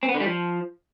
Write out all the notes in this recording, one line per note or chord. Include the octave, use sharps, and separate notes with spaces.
C4
B3
D3
G3
F3